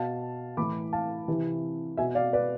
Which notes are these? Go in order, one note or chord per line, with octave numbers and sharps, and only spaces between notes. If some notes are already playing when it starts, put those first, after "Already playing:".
Already playing: B2 F5 A5
A2 E3 B5 D6
F5 A5
C3 E3
B2 E5 G#5
D5 F5
B4 D5